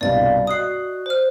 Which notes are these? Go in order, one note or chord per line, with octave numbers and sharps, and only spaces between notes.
C2 G2 B2 D5 F5 A6
F#4 D#5 D#6 F#6 C7
C5 F6